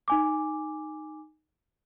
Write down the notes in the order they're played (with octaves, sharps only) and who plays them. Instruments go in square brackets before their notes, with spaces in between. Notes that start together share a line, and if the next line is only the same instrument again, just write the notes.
[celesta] D#4 G#5 D6